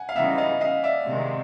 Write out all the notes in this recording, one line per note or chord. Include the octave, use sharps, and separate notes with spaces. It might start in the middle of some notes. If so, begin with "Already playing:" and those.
Already playing: F#5 G#5
F5
C#3 E3 G3 B3 D#4 E5 F#5
D#5 F5
D#5 F5
D5 E5
C3 D#3 G#3 C4